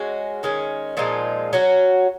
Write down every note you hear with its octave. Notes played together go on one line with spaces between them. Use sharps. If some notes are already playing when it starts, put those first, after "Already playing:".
Already playing: G#3 C#4 F#4
D#3 G#3 C#4
A#2 F3 G#3 D#4
F#3 C#4 F#4